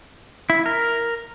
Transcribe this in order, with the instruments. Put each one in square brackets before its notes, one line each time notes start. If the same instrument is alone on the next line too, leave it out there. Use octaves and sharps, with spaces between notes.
[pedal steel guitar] E4
A#4